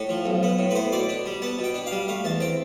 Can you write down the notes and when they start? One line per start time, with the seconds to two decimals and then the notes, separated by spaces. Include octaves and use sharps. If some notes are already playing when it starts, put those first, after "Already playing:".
Already playing: A2 A4
0.09 F3
0.26 B1
0.43 B3
0.59 A2
0.71 B4
0.75 B3 C5
0.92 B2 D5
1.09 D4
1.26 G3
1.42 B3 A5
1.59 B2
1.64 G5
1.74 D4
1.86 F5
1.92 G3
2.08 A3 F5
2.24 E2 A5
2.40 C4 G5